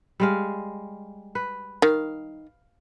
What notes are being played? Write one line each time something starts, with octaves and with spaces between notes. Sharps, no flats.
G3 G#3 F5
B4
D#3 F5